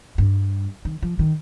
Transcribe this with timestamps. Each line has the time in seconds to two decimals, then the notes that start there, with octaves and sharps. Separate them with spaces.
0.18 G2
0.85 D#3
1.02 F3
1.19 D#3